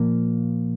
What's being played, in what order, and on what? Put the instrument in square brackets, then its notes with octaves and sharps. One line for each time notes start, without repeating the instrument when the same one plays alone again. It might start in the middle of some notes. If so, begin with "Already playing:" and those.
Already playing: [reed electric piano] A#2 F3 A#3